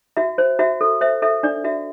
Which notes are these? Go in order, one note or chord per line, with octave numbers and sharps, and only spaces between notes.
F#4 E5
C5
F#4 E5
A4
C5 E5
A4 E5
D4 D5
F#4 E5